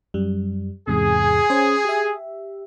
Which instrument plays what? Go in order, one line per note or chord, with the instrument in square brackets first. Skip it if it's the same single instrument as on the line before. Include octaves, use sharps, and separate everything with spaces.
[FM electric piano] F#2 G3
[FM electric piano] E2 G#2 C3 [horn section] G#4
[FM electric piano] C#4 C5
G4 E5